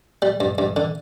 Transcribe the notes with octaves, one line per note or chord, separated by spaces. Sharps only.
G3
G2
G2
D3